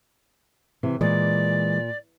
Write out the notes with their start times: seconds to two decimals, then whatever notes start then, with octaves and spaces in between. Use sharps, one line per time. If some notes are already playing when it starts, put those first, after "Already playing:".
0.83 C3 E3
1.01 A#2 E3 G#3 D5